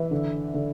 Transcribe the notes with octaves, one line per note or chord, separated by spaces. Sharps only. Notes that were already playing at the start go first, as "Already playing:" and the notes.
Already playing: E3 B4 E5
D3
D3